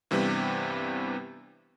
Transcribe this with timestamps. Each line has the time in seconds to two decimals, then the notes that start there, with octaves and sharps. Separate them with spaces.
0.11 G2 C3 E3 G3 B3